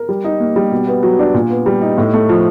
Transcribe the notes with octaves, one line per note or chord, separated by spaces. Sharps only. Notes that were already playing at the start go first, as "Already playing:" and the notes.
Already playing: A#4
G3
D#4
A#3
G3
B2
B3
F#3
D4
A#2
B3
G3
D#4
A2
A3
F3